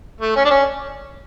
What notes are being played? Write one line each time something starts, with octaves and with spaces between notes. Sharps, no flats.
A3
C#4
D4
C#4